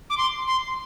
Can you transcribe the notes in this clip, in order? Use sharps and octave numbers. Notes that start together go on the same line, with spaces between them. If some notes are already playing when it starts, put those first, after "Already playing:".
D6
C6
C6